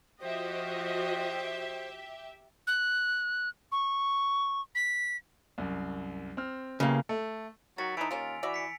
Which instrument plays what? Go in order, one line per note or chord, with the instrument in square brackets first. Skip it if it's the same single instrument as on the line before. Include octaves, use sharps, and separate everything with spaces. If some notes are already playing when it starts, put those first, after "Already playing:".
[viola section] F3 F#4 D#5 [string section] G4 E5 [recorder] C5
[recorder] F#6
C#6
B6
[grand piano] C2 F#2
C4 F6
[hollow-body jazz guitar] C#3 A#3 [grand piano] B3 E4 G4
[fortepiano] A3
[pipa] D#3 [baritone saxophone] F#3 [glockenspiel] A6 B6
[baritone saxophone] E3 [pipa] A3 D#4 [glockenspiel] E6 C#7 D7
[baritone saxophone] D#2 [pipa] A#3 C#4 F4 [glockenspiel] G#5 F7
[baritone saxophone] E3 [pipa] F#4 D5 E5
[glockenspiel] B6 C#7 D7